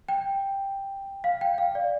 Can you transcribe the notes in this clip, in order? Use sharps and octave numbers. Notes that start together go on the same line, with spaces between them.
G5
F5
G5
F5
D5